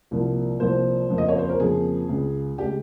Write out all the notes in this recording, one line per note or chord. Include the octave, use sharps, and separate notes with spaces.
C2 A#2 F3 A#3
C2 A#2 F3 A#3 C5
F2 C#3 F3 A#3
D#5
C#5
C5
A#4
F2 C#3 F3 A#3 G#4
C#2 C#3 G#3
C#3 G#3 G4